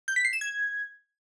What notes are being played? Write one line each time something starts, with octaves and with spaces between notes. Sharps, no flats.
G6
B6
C7
E7
G#6